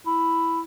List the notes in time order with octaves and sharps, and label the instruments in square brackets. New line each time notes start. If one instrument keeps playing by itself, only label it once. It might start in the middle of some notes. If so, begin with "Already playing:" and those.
[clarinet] E4